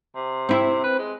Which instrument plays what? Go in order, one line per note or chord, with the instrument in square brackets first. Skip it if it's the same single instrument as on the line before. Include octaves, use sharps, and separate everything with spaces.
[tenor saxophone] C3
[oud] C4 E4
[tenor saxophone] B4
G#3